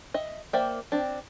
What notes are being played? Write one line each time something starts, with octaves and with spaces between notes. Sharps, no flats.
D#5 E5
A#3 C5 D5 E5 G5
C4 D4